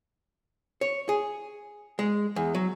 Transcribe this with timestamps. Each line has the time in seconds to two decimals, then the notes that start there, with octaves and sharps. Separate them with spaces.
0.81 C#5
1.09 G#4
1.99 G#3
2.36 E2
2.55 F#3